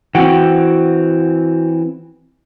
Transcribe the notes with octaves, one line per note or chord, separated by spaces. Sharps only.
E3 C4 F#4 F#5 G5